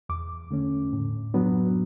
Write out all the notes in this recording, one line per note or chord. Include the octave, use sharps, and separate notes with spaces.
E2 D6
D3 A3 C#4
A2
F#3 B3 D4